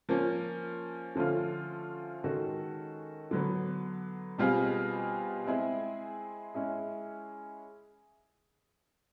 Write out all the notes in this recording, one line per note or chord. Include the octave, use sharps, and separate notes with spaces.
F3 A#3 C#4
D3 F3 A3 C#4 F4
D#3 G#3 C#4 F#4 A4
D3 F#3 B3
B2 G3 C4 F4 G#4
G#3 C4 E4 G#4
G#3 C#4 E4 G#4